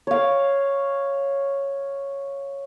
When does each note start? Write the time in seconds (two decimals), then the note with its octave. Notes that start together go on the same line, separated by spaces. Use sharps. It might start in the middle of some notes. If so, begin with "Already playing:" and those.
0.07 C#5 F5